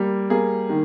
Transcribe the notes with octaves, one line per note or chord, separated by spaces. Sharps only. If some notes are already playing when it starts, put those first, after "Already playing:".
Already playing: G3 A#3
A#3 G#4
D#3